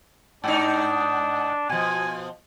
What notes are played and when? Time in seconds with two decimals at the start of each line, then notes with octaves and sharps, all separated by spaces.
0.44 G#2 D4 D#4
1.69 B2 F3 G#5